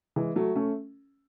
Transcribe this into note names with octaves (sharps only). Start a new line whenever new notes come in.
E3 G#3
F#3 A3
A3 C#4